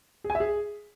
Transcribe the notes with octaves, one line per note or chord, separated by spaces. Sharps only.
G#4
G#5
E5
G#4